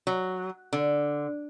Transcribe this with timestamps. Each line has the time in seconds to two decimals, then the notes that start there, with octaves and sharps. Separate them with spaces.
0.07 F#3
0.73 D3